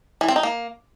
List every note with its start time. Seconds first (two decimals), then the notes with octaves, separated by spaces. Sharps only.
0.21 E3
0.28 C4
0.36 D#4
0.43 A#3